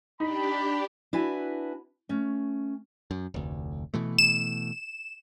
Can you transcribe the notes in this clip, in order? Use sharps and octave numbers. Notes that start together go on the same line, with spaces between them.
D4 D#4 G4 B5
D4 E4 F#4 B4 E5 G#5
A3 C#4
F#2
F1 D2
B2 E3 A3
E7